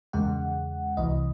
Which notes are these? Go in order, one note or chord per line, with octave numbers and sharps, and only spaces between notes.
E2 C#3 G#3 F#5
C2 C3 E3 D#5